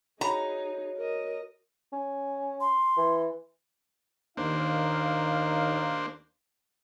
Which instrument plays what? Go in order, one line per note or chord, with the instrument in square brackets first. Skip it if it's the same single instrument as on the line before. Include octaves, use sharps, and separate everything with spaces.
[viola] D#4 G#4 [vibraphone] F#4 C#5 [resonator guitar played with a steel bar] A#5
[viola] A#4 D#5
[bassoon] C#4
[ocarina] C6
[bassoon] E3
[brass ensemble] D#2 D#4 F5 [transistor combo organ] A#3 D4 C5